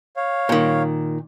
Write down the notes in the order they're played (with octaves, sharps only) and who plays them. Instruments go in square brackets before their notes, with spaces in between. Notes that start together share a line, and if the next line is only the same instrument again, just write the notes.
[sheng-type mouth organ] C#5 F5
[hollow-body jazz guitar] A#2 D#3